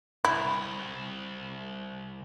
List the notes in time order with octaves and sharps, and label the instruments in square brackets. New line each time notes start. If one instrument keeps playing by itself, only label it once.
[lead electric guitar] C2 F#2 [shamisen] E4